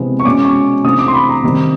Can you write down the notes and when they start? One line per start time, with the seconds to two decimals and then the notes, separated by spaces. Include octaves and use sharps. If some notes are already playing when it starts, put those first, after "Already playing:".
Already playing: C3 E3 G#3 B3
0.20 C#6
0.25 B2 G#3 C#4 D6
0.45 C#6
0.84 C3 E3 A3 D4 D#6
0.99 D6
1.08 C6
1.14 B5
1.29 A#5
1.43 C3 D#3 G3 C4